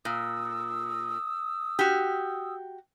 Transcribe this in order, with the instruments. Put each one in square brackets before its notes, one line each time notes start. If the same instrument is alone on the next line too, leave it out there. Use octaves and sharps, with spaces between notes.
[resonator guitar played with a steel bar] A#2 [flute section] D#6 E6
[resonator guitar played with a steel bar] F#4 G4